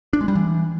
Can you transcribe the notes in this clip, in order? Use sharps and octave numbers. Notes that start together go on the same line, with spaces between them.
D4
G#3
G3
E3